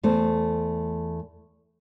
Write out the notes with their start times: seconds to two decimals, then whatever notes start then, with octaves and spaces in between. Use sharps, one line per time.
0.03 E2 A3 C5